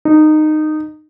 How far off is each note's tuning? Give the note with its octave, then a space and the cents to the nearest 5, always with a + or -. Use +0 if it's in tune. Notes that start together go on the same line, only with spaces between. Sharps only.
D#4 -15